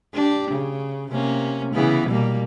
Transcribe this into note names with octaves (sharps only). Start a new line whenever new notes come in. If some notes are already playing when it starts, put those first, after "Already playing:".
D4 G4
C#3
C3 A#3 C#4
C#3 E3 B3
B2 G3 A#3